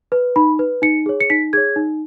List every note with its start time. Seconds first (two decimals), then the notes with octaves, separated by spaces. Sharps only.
0.12 B4
0.36 D#4 B5
0.59 B4
0.82 D#4 C#7
1.06 G#4 C#5
1.21 C#7
1.30 D#4 B6
1.53 G#4 C#5 G#6
1.76 D#4